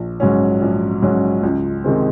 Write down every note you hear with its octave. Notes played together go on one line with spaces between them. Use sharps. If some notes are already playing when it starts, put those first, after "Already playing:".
Already playing: A#1
G#2 F#3 C#4
A#1
G#2 F#3 C#4
C#2
C3 D#3 G#3 C4